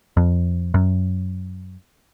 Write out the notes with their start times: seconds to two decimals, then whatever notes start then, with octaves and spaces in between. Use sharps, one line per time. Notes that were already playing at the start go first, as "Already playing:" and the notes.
0.17 F2
0.74 F#2